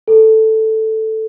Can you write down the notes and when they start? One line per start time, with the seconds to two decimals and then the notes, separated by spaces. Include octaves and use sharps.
0.08 A4